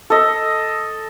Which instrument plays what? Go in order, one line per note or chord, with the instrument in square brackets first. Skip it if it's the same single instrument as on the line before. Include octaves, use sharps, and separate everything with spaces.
[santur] A4 D#5